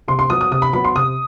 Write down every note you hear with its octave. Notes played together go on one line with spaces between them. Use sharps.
C3 C6
C6
F#3 B3 D#6
D#6
C3 D#6
B5
F#3 B3 B5
C6
C3 D#6